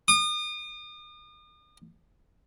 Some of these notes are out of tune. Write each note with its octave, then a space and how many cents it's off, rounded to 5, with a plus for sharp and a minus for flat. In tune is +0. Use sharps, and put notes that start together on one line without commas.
D#6 -40